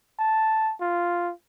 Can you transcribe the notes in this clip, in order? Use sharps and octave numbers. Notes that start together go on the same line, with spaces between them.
A5
F4